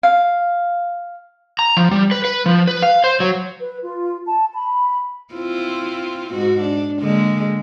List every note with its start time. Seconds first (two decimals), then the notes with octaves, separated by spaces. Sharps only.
0.03 F5
1.59 A#5
1.77 F3
1.91 G3
2.11 B4
2.25 B4
2.46 F3
2.67 B4
2.83 F5
3.04 C5
3.20 F#3
3.60 B4
3.82 F4
4.26 A5
4.54 B5
5.33 C4 E4 F4
6.32 G#2 F#4
6.61 D4
7.00 D3 G#3 A#3